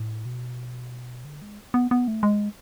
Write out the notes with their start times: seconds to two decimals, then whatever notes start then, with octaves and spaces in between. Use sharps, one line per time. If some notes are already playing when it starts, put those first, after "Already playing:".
Already playing: A2
0.25 B2
1.25 D3
1.42 G#3
1.74 B3
1.91 B3
2.08 A3
2.23 G#3